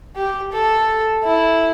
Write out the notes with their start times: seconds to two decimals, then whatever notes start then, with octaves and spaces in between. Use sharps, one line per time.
0.16 G4
0.52 A4
1.24 E4